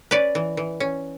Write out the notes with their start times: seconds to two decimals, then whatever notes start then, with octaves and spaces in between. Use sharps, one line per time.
0.11 C#4 B4 D5
0.35 E3
0.57 E3
0.80 C#4